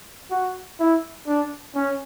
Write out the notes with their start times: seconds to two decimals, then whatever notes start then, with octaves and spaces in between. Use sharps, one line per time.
0.31 F#4
0.79 E4
1.27 D4
1.75 C#4